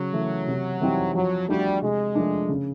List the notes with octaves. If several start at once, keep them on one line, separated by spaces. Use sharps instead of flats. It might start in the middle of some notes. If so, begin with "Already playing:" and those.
Already playing: C#3 F#3
E3 A3
C3
E3 G3 C4 D#4
F3 F#3
G3 A3 D4 F#4 A4
C3 G#3
F3 A3 D4
C#3